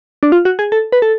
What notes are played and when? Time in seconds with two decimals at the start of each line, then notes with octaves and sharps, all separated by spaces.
0.23 D4
0.32 F4
0.45 F#4
0.59 G#4
0.72 A4
0.92 B4
1.02 A4